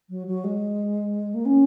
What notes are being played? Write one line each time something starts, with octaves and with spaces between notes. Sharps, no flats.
F#3
F#3
G#3
A#3
C#4